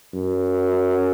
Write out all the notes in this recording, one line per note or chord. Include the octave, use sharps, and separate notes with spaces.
F#2